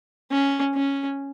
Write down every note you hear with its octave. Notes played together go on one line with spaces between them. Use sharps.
C#4
C#4